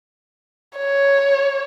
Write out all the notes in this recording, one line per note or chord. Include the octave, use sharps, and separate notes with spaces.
C#5